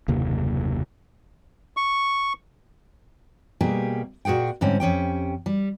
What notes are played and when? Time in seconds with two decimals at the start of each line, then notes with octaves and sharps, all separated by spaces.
0.08 F#1 D#2 C3 A#3
1.77 C#6
3.61 B2 G3 A#3 G4 G#4
4.25 A#2 F#4 G#4 F#5 G5
4.61 G#2 D3 G3 C4 C#4
4.80 F2 C#4 G4 G5
5.46 G3